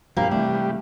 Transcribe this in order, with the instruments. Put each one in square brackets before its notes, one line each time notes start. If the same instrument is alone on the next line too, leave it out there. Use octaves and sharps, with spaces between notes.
[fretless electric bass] G2 B2 F3 [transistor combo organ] G3 [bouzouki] A#3
[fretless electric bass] C3 E3 [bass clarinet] A3 [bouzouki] D4